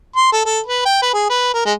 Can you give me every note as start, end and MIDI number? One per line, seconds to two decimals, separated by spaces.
0.16 0.29 84
0.32 0.44 69
0.46 0.60 69
0.67 0.85 71
0.85 0.98 79
1.02 1.13 71
1.14 1.27 68
1.29 1.53 71
1.54 1.61 70
1.65 1.73 56